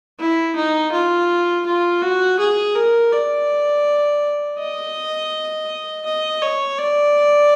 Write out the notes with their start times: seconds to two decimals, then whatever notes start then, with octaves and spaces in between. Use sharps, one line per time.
0.19 E4
0.56 D#4
0.92 F4
1.66 F4
2.02 F#4
2.39 G#4
2.76 A#4
3.12 D5
4.59 D#5
6.06 D#5
6.42 C#5
6.79 D5